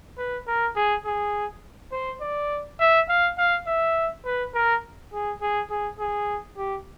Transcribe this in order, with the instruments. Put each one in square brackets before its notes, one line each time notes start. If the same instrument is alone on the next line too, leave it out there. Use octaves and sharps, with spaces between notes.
[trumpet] B4
A#4
G#4
G#4
C5
D5
E5
F5
F5
E5
B4
A#4
G#4
G#4
G#4
G#4
G4